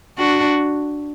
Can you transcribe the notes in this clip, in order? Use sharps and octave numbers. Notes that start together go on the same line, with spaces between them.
D4 F#4